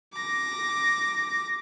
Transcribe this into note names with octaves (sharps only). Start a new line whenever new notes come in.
D6 A#6